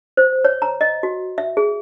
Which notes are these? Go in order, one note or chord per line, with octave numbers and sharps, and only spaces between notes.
C5
C#5
A#5
D#5
F#4
E5
G#4